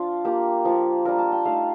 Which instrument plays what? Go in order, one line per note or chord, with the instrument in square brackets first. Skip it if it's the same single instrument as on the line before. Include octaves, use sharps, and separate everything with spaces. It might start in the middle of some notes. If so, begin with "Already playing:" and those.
Already playing: [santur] F3 D4 F4
A#3 F4 G4
F3 A#3 F4
G3 D4 F4 A#4
A5
G5
A3 D#4 F5